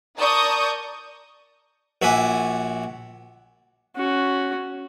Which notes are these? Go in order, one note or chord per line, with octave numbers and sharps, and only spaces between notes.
A#4 D5 A5 C#6 D#6 G6
A#1 F#4 E5 F#5 G#5 D6
C#4 F#4